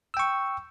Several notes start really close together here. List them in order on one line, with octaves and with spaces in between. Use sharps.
E6 G5 C#6